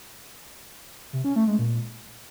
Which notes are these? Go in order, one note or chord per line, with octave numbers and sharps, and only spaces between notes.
C3
C#4
A3
G#3
A#2